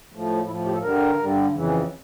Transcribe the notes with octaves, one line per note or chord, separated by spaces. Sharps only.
A2 F3
A2 F3 E4
G4
A4
G2 D3 G3 A#4
G2 D3 G3
F2 C#3 E3